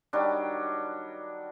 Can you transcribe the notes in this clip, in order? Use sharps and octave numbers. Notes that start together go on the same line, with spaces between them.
D#3 F#3 G3 D4